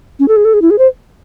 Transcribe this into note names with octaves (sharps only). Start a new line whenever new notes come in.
C#4
A4
G#4
A4
G#4
E4
G#4
C5